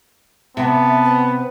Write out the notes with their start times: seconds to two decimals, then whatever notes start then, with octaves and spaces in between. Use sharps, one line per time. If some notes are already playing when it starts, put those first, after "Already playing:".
0.57 C3 B3 E5 A5
1.05 B4